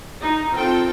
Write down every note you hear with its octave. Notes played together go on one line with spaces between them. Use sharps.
D#4
C4 F4 A4 G5